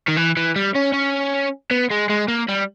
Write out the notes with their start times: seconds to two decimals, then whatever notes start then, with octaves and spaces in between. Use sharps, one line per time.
0.08 D#3
0.17 E3
0.37 E3
0.56 G3
0.76 C#4
0.94 C#4
1.71 B3
1.91 G#3
2.10 G#3
2.28 A#3
2.48 G3